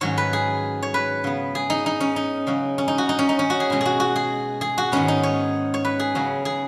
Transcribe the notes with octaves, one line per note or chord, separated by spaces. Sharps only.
G#2 D#3 F#3 C#4 C#5
B4
G#4
C#5
B4
C#3 B3
G#4
D#4
D#4
C#4
D#4
C#3 F#3 C#4
C#4
D#4
F#4
D#4
C#4
D#4
C#4
F#4
G#4
B2 G#3 C#4
F#4 G#4
F#4
G#4
G#4
F#4
G#2 D#3 G#3 B3 C#4
D#4
C#5
C#5
B4
G#4
C#3 F#3 C#4
G#4